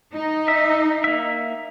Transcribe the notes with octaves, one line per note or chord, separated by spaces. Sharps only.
D#4
E5
A#3 E5